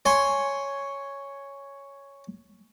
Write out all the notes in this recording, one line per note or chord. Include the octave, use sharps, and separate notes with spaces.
C#5 G#5 C6